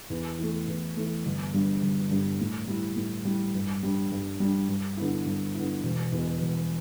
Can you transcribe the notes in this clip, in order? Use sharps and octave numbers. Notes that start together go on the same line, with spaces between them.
E2
E3 A3
E2
E3 A3
G1
G2 G3 D4
G1
G2 G3 D4
A2
G3 E4
A2
G3 E4
G2
G3 D4
G2
G3 D4
G2
D3 B3 E4
G2
D3 B3 E4
E1
E2 B2
E1